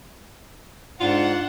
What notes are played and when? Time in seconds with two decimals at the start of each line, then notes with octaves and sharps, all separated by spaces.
1.00 G#2 D4 F4 F#5